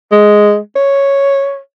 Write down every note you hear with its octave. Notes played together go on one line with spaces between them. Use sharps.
G#3
C#5